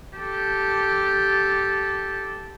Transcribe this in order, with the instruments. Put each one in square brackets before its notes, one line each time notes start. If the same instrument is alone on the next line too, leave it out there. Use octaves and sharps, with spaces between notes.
[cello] G4 A4